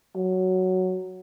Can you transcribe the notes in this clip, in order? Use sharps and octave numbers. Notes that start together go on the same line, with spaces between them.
F#3